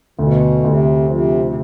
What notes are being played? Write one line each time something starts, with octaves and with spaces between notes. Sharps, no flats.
D2 B2
D2 C3
C3 F3
C3